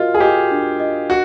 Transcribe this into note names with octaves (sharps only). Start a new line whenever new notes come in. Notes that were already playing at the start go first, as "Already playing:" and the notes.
Already playing: F4 F#4 A#4 D#5
G#4
G4 D#5
D4
D#5
F#4